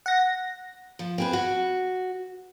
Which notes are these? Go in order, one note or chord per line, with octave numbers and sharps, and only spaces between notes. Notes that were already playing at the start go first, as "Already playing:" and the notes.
F#5 A#6
F3
C4 G#4 B4
F#4